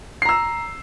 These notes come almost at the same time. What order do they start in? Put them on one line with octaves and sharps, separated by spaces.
C7 A#5 E6